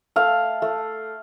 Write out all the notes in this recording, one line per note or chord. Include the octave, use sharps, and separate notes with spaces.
A3 F5
A3